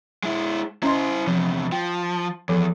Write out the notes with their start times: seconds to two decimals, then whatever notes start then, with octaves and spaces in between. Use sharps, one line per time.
0.23 G#3 E4
0.83 C#4 E4 C5 D#5 C6
1.27 E2 C3 F3
1.72 F3 G5
2.49 E2 F3 A4